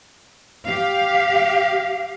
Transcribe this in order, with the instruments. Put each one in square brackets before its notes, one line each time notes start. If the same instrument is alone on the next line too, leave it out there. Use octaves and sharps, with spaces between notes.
[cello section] G4 F5